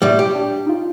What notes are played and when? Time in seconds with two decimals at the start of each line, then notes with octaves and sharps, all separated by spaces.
0.02 A2 G3
0.19 G4
0.35 D4
0.66 D#4 F4